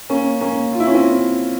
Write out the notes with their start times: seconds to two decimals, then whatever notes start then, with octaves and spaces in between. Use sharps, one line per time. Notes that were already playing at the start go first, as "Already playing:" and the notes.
0.09 A#3 C#4
0.41 A#3 C#4
0.72 F4
0.80 E4
0.87 C#4
0.94 C4 E4